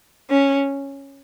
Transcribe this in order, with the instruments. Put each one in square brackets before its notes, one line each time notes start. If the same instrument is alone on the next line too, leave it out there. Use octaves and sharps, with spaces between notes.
[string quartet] C#4